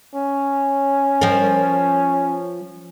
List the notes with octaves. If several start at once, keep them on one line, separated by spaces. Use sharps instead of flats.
C#4
F3 A#4